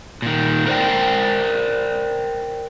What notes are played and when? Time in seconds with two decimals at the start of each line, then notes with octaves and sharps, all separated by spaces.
0.22 A#2 D#3
0.67 A#4 C5 D5 G5